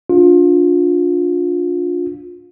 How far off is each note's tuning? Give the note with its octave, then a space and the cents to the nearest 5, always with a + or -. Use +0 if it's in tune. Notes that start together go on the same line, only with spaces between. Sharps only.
D4 -15 F4 +25